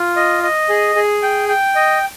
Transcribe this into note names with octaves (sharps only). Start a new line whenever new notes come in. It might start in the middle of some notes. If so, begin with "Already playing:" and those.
Already playing: F4
D#5
D#5
G#4
G#4
G5
G5
D#5